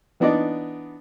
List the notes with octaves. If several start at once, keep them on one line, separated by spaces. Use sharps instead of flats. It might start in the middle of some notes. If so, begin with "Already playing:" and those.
E3 B3 D4 D#4 D5